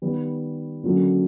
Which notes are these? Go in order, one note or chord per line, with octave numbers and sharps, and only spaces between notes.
D#3 G3 B3
D3 F#3 A#3 C#4